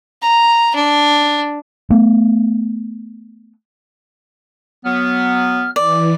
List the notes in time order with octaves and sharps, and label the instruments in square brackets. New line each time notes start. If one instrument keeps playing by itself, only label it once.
[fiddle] A#5
D4
[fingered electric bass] A3 B3
[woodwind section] F#3 B3 [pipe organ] F6
[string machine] E3 [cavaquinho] D5